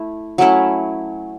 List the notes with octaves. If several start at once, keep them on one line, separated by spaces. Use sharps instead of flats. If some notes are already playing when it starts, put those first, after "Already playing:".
Already playing: A3 E4
F#3 A3 C#4 E4